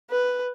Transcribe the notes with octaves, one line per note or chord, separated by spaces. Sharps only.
B4